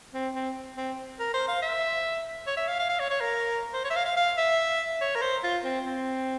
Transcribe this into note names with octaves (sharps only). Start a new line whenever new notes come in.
C4
C4
C4
A#4
C5
F5
E5
C#5
E5
F5
F5
F5
C#5
C#5
A#4
C5
C#5
E5
F5
F5
F5
E5
C#5
A#4
C5
F4
C4
C4